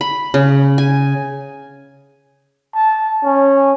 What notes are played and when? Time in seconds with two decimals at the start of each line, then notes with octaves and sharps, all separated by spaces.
0.01 B5
0.34 C#3
0.78 G#5
2.75 A5
3.24 C#4